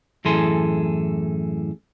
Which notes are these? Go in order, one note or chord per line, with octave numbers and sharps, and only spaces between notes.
F#2 A2 E3 G#4 A4 C6